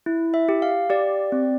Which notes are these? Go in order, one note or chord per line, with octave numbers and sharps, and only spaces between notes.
E4
E5
G4
F5
G4 D5
C4